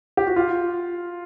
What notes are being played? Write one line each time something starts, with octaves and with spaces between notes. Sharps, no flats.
G4
F#4
F4